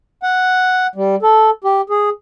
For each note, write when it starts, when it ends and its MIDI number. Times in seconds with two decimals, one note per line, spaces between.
0.23 0.87 78
0.96 1.15 55
1.22 1.50 69
1.64 1.81 67
1.90 2.10 68